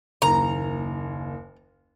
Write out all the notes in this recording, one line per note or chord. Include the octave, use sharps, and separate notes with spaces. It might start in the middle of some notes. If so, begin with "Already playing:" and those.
F#1 D#2 A#5